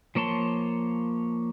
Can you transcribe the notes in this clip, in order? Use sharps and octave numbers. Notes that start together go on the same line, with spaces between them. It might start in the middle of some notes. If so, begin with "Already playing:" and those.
F3 A#3 C#5 A5 C6